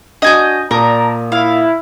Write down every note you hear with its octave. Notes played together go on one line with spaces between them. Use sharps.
D4 F#4 D#5 G#5 G6
A#2 A#4 D5 A5 A#5 D#6
E4 F5